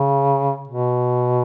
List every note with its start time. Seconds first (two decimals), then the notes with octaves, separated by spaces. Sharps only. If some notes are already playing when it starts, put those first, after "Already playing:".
Already playing: C#3
0.68 B2